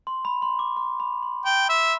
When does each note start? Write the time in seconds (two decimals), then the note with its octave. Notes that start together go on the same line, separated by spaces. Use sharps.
0.07 C6
0.25 B5
0.42 C6
0.59 D6
0.77 C6
1.00 B5
1.23 C6
1.45 G5 B5
1.69 E5 C6